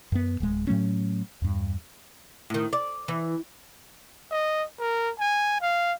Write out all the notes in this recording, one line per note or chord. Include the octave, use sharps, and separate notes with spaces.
F#2 B3
D1 G#3
A2 F#3 A3 C#4
E2 G2
A2 D#3
D5
E3
D#5
A#4
G#5
F5